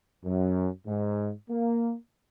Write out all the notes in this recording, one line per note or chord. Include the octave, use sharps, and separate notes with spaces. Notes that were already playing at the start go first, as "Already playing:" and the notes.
F#2
G#2
A#3